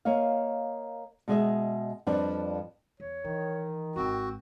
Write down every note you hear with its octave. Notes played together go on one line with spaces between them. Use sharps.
A#3 C#5 D#5 F5
B2 G#3 D#5 E5
F2 F3 G3 D4 B4
E2 C#5
D#3 E3
D#1 G#1 C4 F#4